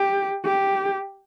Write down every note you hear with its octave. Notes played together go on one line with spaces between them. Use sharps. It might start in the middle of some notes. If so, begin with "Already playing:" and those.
Already playing: G4
G4